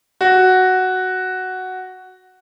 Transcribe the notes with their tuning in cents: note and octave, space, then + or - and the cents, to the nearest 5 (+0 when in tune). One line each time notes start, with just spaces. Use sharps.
F#4 +5